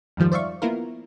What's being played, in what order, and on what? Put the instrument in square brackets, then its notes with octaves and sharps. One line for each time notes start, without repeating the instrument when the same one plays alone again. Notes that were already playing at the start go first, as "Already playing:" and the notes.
[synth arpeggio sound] F2 G#2 D#3 F3 G3
C5 D5 E5 F5 C#6
A#3 B3 E4 F4 A#4